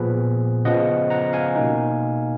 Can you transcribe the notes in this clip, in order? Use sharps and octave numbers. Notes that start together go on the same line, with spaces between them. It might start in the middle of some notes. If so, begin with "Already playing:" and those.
Already playing: A#2 F3 B3 G#4 B4
C#3 F3 B3 D#5 F#5
F#5 A#5
F5 G#5
B2 A#3 D#4